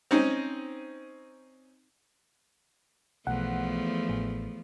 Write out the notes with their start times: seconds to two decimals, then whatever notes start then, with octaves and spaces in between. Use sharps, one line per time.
0.11 C4 C#4 D#4
3.27 B1 E2 F3 A3 F#5
4.09 A1